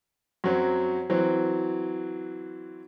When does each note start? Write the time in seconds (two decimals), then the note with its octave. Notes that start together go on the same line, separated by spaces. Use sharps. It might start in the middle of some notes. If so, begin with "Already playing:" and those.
0.44 F#2 F#3 C4
1.10 E3 F#3 C4